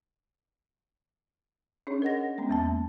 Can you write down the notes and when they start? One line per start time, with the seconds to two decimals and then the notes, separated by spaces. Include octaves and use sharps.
1.87 C#4 D4 G#4 C#5
2.02 A#4 D#5 F#5 A#6
2.38 G#3 B3 C#4
2.49 E2 A#3 A5